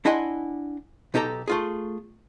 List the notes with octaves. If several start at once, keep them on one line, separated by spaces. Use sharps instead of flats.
D4 E4 D#5 F#5 G#5 C6
B1 D#4 G4 A4 A#5
A3 F4 G#4